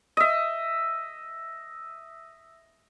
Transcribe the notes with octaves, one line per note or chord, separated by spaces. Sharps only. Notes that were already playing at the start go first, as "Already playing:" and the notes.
D#5 E5